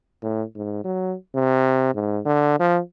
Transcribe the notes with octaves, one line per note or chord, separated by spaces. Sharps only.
A2
G#2
F#3
C3
G#2
D3
F3